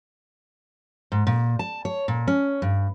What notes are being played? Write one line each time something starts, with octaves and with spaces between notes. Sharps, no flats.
G#2
A#2
A5
C#5
A#2
C#4
G2